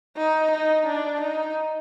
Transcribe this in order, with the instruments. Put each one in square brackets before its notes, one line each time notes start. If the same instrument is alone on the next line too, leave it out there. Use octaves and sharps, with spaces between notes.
[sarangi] D#4
D#4
D4
D#4